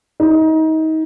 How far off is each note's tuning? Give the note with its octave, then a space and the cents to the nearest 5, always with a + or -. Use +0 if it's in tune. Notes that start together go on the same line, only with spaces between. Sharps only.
D#4 +30